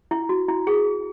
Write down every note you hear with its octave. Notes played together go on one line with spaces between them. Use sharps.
E4
F#4
E4
G#4